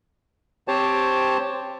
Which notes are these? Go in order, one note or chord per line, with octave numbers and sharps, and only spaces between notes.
C4 G4 C5 C#5 A5